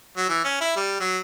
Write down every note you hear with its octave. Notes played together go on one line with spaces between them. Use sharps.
F#3
E3
C#4
E4
G3
F#3